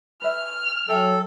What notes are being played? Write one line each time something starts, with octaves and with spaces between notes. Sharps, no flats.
B4 E5 F6
F#3 C#4 A4 E5 G5